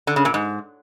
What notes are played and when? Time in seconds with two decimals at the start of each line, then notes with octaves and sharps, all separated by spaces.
0.07 D3
0.16 C#3
0.25 A#2
0.34 G#2